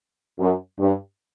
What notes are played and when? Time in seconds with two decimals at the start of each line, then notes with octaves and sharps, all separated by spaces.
0.39 F#2
0.79 G2